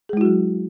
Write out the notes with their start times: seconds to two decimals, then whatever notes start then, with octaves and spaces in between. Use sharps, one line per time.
0.09 G#4
0.13 G#3
0.17 E4
0.21 F#4
0.25 F#3